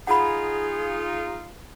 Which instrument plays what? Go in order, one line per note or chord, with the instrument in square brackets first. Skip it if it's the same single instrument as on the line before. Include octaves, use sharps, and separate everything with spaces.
[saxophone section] D#4 F4 [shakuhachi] G#4 [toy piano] F#5 B5